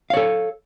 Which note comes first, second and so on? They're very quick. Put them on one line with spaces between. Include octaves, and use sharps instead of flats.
F5 C#5 A4